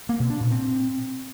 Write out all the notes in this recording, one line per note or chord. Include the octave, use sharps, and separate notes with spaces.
A#3
B2
D4
A#2
C4